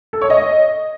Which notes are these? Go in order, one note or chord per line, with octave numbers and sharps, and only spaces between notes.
A4
C#5
D#5